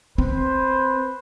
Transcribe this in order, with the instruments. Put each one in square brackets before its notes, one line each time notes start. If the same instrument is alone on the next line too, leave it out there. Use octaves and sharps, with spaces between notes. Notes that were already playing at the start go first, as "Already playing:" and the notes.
[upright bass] C4 [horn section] B4 C5